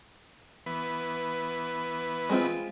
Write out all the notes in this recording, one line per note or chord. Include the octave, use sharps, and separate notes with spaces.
E3 B3 B4
G#3 C4 F4